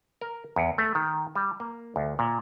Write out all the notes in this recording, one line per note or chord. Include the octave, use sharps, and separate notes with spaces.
A#4
E2
A3
D#3
G3
A#3
D2
A#2